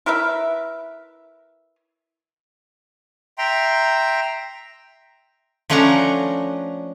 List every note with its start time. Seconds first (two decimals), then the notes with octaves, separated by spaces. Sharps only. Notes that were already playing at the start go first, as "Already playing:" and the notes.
0.06 E4 A#4 B4 E5
3.38 E5 G5 A#5 C6
5.70 F3 A3 C#4 D4 F#5 A#5